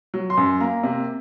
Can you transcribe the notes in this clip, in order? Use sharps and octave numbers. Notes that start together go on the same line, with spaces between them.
F#3
C6
F#2
A#3 A#5
C3